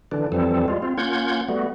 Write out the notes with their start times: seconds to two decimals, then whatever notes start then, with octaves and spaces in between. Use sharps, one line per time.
0.12 D3 E3 D4
0.32 F2 E3 F3 G3 C4 A4
0.68 G3 G#3 F4
0.82 C4 F4
0.98 A#3 C#4 F4 F#5 G6 G#6
1.48 G3 A3 B3 F#4